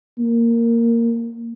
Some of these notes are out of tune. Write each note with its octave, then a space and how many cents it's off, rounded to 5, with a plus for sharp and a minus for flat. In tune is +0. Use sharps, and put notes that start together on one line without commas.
A#3 -10